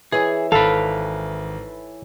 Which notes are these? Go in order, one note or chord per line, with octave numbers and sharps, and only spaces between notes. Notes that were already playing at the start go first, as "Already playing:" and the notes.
E3 G#4 C#5 E5
G#1 A4 B4 F5 A6 D7